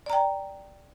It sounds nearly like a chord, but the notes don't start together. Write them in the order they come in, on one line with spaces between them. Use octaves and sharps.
D5 A#5 G5